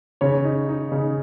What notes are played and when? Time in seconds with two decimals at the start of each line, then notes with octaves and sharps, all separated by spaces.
0.21 C#3 C#5
0.44 D#4
0.69 D#4
0.92 C#3